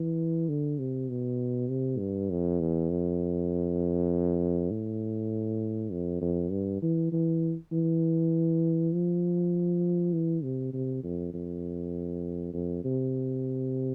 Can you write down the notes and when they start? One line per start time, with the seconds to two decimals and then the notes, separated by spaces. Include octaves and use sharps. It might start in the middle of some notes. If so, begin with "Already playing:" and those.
Already playing: E3
0.49 D3
0.79 C3
1.09 B2
1.69 C3
1.99 G2
2.30 F2
2.60 E2
2.90 F2
4.70 A2
5.92 F2
6.21 F2
6.51 G2
6.82 E3
7.12 E3
7.72 E3
8.93 F3
10.13 E3
10.43 C3
10.73 C3
11.03 F2
11.34 F2
12.53 F2
12.84 C3